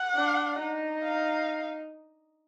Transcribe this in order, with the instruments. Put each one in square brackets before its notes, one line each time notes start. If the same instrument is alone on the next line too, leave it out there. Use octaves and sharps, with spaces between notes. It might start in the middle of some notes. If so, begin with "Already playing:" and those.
Already playing: [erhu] F#5
[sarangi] D4
D#4
[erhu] F5